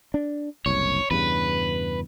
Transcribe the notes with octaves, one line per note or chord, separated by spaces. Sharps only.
D4
F#1 C2 C#5
E2 G2 C#3 B4